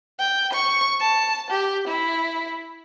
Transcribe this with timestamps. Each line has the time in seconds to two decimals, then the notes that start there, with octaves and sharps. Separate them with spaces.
0.19 G5
0.53 C#6
1.00 A5
1.51 G4
1.87 E4